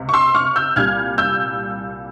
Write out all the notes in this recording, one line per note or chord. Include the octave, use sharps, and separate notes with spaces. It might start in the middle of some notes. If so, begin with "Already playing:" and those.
Already playing: C#2 C3
C#6
C6 E6
C#6 F6
E6 G6
C2 A#2 G3 F6 G#6
E6 G6